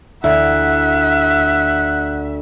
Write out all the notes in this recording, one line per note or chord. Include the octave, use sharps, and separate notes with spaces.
D2 E4 E5 F#5